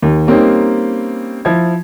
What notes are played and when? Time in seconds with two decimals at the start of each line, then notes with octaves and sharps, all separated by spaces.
0.02 D#2
0.27 G3 A#3 C4 C#4 D#4
1.45 F3 E4 G#6